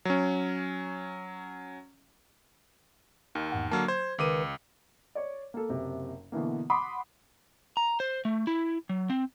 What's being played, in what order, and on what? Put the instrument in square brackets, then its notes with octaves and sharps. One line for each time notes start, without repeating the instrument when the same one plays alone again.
[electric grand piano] F#3 C#4
D#2 D#3
[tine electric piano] E2 G#2 F#5
[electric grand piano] D3 F#3 A#3 [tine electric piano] A5 F6
[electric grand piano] C5 [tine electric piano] G#6
[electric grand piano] C#2 D6 D#7 [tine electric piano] D#3 A#4 B4
[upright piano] C#5 D5
A#3 A4
F#1 C3
B2 D3 E3 A#3
F#5 B5 C6 D6 D#6
[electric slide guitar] A#5
C5
A3
E4
F#3
C4